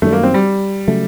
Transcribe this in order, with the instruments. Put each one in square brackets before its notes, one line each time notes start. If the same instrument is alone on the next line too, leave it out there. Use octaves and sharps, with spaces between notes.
[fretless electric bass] F#2 D#3 G3 [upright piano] A3
[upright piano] A#3
C4
G3
[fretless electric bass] C#3 F#3 A3